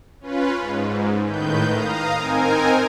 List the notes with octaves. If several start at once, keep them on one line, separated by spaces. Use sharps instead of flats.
C#4 F4 B4
G#2
A2 D#3 B4 G6
F5 A#5 D#6
C4 D#4 A#4 G#5